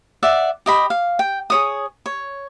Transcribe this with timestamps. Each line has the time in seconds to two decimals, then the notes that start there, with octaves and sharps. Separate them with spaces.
0.23 D5 E5 F#5
0.66 G4 D#5 B5
0.90 F5
1.19 G5
1.50 G#4 C#5 D#6
2.06 C#5